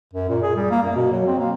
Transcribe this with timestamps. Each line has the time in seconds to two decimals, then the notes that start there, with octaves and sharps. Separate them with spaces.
0.14 F#2
0.29 A#2
0.43 G#4
0.56 G3
0.71 A#3
0.84 F#2
0.95 B2
1.12 F#3
1.26 C4
1.39 A#3